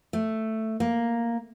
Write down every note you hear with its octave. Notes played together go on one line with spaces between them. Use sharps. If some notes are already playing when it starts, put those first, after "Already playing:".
A3
A#3